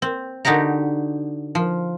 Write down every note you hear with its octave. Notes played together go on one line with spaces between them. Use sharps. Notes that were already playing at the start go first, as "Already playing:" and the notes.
C4
D3 D#4 F#4 G4 A#5
F3